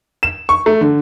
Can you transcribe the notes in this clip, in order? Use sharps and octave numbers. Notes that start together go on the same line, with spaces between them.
E7
C#6
A3
D3